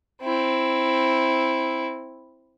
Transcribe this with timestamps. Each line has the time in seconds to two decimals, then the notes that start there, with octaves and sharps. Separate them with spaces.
0.22 C4 E4